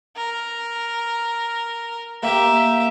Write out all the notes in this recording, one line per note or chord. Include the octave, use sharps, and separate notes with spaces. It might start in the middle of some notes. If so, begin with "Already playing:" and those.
A#4
A#3 G4 E5